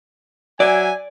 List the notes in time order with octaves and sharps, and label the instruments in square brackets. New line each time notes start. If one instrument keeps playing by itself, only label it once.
[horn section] F#3 E5 G#5 [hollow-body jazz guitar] D5